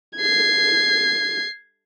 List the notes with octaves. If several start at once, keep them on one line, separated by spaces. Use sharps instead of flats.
G#6 C7